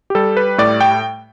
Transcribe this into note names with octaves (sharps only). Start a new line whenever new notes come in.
G4
G3 A4
B4
A2 D5
G5